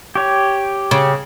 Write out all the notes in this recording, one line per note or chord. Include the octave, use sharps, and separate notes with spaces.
G4 C#5
C#3